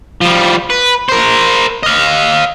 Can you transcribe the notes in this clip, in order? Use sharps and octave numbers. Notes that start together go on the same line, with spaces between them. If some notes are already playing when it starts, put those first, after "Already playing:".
F3 G3
B4
A#4 C5
D#5 F5